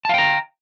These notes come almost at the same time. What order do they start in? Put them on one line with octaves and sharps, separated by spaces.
A5 F5 G5 A#5